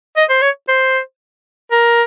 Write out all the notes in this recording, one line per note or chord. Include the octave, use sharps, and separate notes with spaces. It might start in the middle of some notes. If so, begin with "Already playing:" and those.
D#5
C5
C#5
C5
A#4